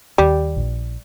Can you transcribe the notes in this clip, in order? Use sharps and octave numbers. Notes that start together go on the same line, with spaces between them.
D#2 G3
A#1